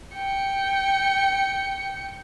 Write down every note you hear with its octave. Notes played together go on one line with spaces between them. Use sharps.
G5 C#7